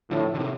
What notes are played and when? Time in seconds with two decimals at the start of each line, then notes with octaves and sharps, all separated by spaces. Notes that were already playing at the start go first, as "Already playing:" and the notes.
0.11 A2 D3 F3
0.34 D3
0.39 C3 D#3